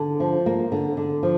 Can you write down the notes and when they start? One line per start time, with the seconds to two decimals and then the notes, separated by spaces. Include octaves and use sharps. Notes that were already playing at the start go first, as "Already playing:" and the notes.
Already playing: D3
0.20 F3
0.46 A#3
0.72 D3
0.97 D3
1.23 F3